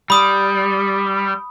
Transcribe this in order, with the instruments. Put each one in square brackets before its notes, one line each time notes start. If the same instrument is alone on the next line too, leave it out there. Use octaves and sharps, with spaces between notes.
[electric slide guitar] G3 [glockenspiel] B5 D#6